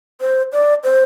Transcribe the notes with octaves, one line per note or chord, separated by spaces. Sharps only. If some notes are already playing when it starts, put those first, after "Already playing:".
C5
D5
C5